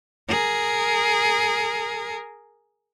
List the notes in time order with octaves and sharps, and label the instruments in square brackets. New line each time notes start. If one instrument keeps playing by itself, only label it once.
[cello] G#4 A#4